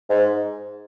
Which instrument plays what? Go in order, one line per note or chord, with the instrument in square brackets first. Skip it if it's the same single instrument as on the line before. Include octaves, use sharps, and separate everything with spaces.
[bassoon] G#2